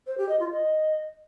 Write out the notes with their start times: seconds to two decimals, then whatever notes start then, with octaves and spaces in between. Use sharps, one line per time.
0.07 C5
0.18 G4
0.29 D#5
0.40 F4
0.51 D#5